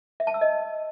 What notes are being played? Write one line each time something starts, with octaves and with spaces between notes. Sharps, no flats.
E5
A5
E6
D#5